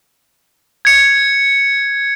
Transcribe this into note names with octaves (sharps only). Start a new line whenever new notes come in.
G#6 C#7